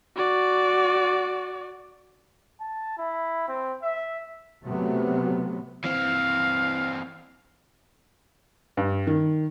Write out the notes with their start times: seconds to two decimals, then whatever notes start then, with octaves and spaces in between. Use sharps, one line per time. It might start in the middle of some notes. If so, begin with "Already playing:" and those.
0.16 F#4 D5
2.60 A5
2.98 E4
3.48 C4
3.83 E5
4.64 C3 F#3 A3 B3
5.85 E3 C4 F5
8.77 G2
9.07 D#3